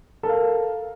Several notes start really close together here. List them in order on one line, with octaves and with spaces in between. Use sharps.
A4 A#4 F5